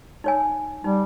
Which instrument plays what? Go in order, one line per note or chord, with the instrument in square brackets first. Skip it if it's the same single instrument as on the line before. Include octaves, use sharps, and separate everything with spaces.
[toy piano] D#4 C#5 G#5
[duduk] G3 [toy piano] D#4